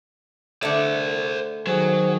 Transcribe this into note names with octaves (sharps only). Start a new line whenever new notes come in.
D3 A3 C5 D5
D#3 F#3 G#4 C5